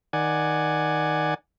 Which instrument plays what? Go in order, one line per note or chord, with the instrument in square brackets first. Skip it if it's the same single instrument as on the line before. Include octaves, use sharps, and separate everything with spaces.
[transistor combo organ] D#3 D5 F#5 G#5